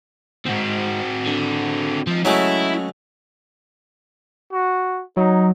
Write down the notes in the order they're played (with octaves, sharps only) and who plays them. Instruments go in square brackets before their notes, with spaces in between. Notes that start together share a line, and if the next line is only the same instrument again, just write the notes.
[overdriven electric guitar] D#2 G#2 [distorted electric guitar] C4 F#4
[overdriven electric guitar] D3
[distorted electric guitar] F3 [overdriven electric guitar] C4 D#4
[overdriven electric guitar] C#3 [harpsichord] F#3 G#3 A3 [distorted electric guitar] E4
[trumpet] F#4
[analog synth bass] F#3 [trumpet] D#4